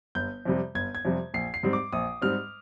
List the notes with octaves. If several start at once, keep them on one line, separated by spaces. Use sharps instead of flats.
G1 G6
F2 C3 G3
G1 G#6
G#6
F2 C3 G3
A#1 C7
C7
G#2 G3 C4
D6
A#1 D#6
G#2 G3 C4 F6